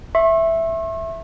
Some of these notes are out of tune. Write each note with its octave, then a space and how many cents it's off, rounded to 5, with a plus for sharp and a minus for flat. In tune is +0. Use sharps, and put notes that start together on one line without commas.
E5 +0 C#6 -45